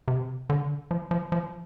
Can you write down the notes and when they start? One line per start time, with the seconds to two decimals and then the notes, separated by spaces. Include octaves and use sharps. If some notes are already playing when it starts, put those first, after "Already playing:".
0.08 C3
0.50 D3
0.91 F3
1.11 F3
1.32 F3